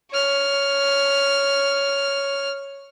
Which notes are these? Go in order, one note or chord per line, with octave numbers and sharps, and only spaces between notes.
C#5 F6